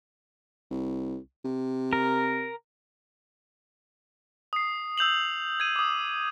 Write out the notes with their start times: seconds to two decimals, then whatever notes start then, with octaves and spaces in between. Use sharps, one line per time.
0.71 C2
1.45 C3
1.93 A#4
4.53 D#6 C7
4.98 E6 G6 F7 F#7
5.60 G#6 D#7
5.76 D6 D#6